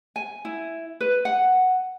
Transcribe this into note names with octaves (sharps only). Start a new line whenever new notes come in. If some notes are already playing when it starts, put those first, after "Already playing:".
G#5
E4
B4
F#5